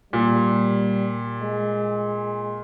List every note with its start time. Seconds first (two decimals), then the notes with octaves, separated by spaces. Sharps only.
0.13 A#2 G3
1.42 G#3